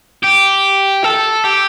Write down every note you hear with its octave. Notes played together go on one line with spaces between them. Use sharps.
G4
A4
G4